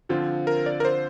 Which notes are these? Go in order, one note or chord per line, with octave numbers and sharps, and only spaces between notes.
D3 F3 C4 F4
A#4
D5
A#4
C5